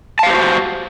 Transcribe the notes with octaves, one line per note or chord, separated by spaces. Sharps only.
F#4 G4 C5 F5 A5